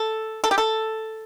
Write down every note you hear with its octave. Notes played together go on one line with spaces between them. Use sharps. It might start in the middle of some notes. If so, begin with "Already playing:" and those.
Already playing: A4
A4
G4
A4